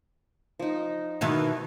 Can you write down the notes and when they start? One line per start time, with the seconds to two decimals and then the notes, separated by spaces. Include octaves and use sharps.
0.59 F3 D#4
1.21 B2 D#3 E3